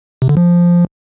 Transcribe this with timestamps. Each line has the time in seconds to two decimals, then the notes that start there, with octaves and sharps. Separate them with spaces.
0.22 C3
0.29 D3
0.37 F3